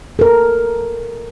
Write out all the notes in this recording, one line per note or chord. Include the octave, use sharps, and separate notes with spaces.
A4 A#4